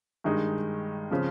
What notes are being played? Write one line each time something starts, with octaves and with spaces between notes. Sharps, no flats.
G2 D#3 G#3 D#4
C#3 F3 C4